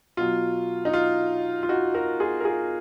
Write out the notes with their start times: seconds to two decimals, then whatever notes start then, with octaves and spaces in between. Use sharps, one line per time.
0.17 B2 F#3 F4
0.85 D#4
0.94 F4
1.63 F4
1.69 D#4 F#4
1.94 F#4 A#4
2.20 F4 G#4
2.40 A#4
2.45 F4 G#4